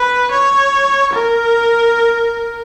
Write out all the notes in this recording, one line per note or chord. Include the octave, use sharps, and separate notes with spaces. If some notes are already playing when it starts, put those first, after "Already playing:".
Already playing: B4
C#5
A#4